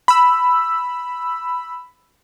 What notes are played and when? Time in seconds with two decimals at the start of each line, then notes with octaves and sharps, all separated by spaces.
0.08 B5 E6